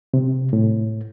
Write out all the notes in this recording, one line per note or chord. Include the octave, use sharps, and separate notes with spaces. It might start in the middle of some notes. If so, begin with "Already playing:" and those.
C3
A2